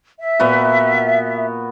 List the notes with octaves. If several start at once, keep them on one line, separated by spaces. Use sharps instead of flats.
E5
A#2 B3 F#4